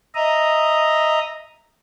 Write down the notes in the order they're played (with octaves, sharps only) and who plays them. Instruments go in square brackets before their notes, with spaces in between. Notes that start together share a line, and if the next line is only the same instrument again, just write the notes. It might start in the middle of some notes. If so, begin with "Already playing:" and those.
[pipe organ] D#5 E5 A#5 D#6